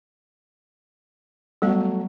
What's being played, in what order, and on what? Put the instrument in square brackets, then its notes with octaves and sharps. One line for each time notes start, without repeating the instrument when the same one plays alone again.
[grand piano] F#3 A3 [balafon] G3 B3 F5